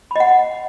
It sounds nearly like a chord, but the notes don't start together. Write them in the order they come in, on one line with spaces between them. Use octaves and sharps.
B5 D#5 F#5